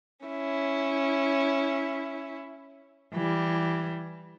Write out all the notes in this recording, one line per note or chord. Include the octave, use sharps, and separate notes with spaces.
C#4 E4
E3 G3